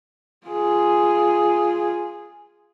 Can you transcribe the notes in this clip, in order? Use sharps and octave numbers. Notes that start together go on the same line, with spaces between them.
F4 G#4